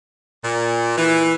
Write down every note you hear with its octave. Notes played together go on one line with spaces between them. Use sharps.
A#2
E3